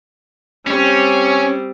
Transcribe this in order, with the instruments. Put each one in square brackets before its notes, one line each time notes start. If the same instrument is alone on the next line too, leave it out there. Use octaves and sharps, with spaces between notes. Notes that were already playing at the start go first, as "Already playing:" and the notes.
[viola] G3 C4 [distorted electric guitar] C#4